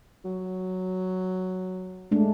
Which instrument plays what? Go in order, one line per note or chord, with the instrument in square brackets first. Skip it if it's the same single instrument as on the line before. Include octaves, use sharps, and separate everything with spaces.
[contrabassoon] F#3
[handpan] G#3 A3 D4